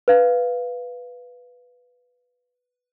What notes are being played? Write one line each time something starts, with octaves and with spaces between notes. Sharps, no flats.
B4 F5